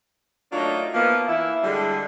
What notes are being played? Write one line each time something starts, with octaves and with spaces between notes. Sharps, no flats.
F#3 A3 A#3 D4 D#4 F4
F3 A#3 B3
E3 E4
D3 G3 G#3